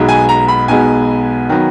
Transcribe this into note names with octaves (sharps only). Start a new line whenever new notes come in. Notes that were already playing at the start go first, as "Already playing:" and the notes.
Already playing: B1 B2 G#3 B3
G#5
A#5
B5
B1 B2 G#3 B3 G#5
D#3 F#3 B3